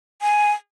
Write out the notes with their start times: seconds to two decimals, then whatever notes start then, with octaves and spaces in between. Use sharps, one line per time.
0.21 G#5